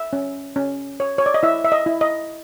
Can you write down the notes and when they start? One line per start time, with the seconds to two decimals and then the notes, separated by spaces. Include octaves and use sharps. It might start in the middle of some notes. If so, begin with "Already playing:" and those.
Already playing: E5
0.13 C#4
0.56 C#4
1.00 C#5
1.18 C#5
1.26 D5
1.34 D#5
1.43 E4 E5
1.64 E5
1.72 D#5
1.86 E4
2.01 D#5